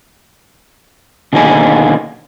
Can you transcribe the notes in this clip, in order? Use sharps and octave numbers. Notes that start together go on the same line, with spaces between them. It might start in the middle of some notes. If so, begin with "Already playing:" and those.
B2 D3 D#3 A#3 D#4 G#4